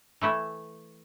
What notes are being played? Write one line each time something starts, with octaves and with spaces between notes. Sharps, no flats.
E3 A3 E4